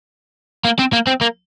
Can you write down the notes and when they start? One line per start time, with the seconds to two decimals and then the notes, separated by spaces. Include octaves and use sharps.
0.65 A#3
0.79 C4
0.93 A#3
1.07 C4
1.21 A#3